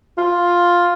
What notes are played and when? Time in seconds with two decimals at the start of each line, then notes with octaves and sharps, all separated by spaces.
0.18 F4